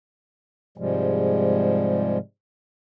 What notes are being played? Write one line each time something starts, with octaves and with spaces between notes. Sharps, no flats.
G#2 C3 F3 G3 G#3